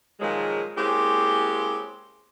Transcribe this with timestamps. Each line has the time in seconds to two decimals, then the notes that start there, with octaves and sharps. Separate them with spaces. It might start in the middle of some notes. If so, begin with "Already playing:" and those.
0.20 A#2 D#3 F3 F#3 G#3
0.76 G#3 A#3 C4 C#4 E4 G4